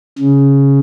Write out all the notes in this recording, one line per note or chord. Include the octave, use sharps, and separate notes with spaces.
C#3